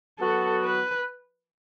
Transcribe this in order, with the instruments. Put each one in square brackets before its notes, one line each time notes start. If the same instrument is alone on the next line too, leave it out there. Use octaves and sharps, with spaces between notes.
[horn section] F#3 B3 F#4 [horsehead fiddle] A4
[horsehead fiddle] B4